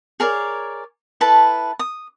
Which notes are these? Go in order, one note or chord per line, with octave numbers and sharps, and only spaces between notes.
G#4 A#4 C#5 D5
E4 A4 B4 A5
D#6